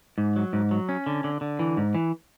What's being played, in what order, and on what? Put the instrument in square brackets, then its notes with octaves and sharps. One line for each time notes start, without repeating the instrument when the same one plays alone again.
[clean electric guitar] G#2
F#3
G#2
F#3
C#4
D3
D3
D3
E3
G#2
E3